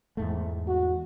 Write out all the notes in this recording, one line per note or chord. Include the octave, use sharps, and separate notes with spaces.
E2 G#2 A3
F#4